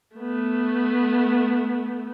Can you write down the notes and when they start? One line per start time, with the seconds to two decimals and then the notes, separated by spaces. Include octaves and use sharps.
0.16 A3 B3